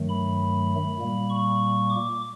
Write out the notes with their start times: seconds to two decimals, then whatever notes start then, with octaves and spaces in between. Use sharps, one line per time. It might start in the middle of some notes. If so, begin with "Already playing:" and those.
Already playing: G2 D#3 F#3 A3
0.09 B5
0.99 A#2 G3 A#3
1.30 C#6
1.90 D6